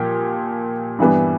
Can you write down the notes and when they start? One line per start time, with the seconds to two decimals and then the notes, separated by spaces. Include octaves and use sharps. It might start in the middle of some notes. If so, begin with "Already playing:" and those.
Already playing: A#2 F3 G4
0.99 G2 E3 G3 B3